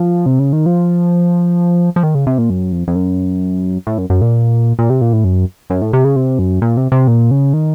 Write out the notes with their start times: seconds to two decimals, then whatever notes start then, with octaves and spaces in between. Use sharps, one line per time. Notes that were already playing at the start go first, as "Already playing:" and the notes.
Already playing: F3
0.26 C3
0.39 C#3
0.53 D#3
0.66 F3
1.96 F3
2.03 D#3
2.15 C#3
2.27 C3
2.38 A#2
2.50 F#2
2.72 F2
2.88 F2
2.96 F#2
3.87 A2
3.98 F#2
4.10 F#2
4.22 A#2
4.79 A#2
4.90 C3
5.01 A#2
5.13 A2
5.24 F#2
5.70 F#2
5.82 A2
5.93 C3
6.04 C#3
6.16 C3
6.39 F#2
6.62 A#2
6.77 C3
6.92 C3
7.08 A#2
7.31 C#3
7.53 D#3